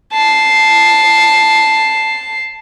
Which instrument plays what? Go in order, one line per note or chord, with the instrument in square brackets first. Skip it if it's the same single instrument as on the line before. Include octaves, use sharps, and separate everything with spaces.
[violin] A5 C7